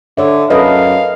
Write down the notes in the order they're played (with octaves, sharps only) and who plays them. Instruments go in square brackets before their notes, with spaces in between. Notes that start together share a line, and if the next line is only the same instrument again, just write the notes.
[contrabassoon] D3 [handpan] A4 C#5 E5
[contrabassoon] F#2 [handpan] A4 B4 D#5 [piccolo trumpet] F5